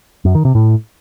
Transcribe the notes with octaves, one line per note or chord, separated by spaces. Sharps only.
F#2
D#3
C3
A2